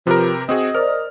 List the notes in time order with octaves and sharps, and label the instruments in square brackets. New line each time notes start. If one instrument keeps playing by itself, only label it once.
[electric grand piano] C3 G4 A#4 [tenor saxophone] F3 [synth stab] B4
[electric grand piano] C4 F#4 G#4 [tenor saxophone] D#5
[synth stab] A#4 C5 D5 [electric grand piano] F6